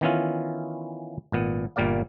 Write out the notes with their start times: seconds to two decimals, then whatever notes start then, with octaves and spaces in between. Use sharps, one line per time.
0.01 D#3 E3 B3 C#4 E4 F4
1.32 G#1 A#2 B3
1.76 G1 A#2 G3 A#3 D5 F5